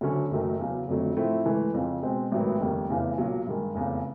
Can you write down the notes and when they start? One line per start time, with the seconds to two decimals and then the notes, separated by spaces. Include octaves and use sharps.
0.01 D2 D3 F#3 A3 C#4
0.31 F#1 F#2 D#3 F#3 A3
0.59 E2 C#3 F#3
0.87 F1 F2 D3 F#3 A3
1.17 A2 F3 A3 C4 E4
1.46 G#2 E3 A3
1.74 F2 C#3 F3
2.02 B2 G#3 C4
2.32 A1 G#2 D#3 F#3 B3
2.60 F1 D#2 D#3 G3
2.89 F1 E2 C#3 E3
3.18 B1 A#2 F#3
3.47 G2 D#3 G#3
3.75 F1 E2 C#3